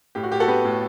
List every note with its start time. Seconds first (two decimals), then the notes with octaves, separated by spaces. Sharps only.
0.15 A2 G4
0.23 F#4
0.32 A2 G4
0.40 F#4 A4
0.48 B3 G4 B4
0.65 A2